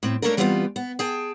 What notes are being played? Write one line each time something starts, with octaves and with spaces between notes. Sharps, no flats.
A2 C4
A3 A#3 C#4 D4 A4 A#4
E3 G3 B3 C4 D#4 F4
B3
G#4 G5 A5